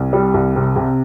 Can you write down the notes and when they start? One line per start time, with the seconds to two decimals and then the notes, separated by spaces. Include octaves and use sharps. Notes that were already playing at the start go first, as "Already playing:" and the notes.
Already playing: C2
0.13 G3
0.34 C2
0.56 C3
0.76 C3